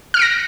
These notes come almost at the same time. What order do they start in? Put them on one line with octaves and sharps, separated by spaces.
F6 C#7 D7 A#6